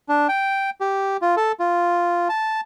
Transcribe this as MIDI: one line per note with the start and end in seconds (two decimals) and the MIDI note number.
0.09 0.27 62
0.29 0.70 79
0.81 1.17 67
1.22 1.35 65
1.37 1.52 69
1.60 2.28 65
2.29 2.61 81